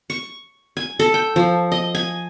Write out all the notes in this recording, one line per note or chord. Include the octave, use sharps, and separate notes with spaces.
C#6
G#5
A4
G5
F3
D#5
G#5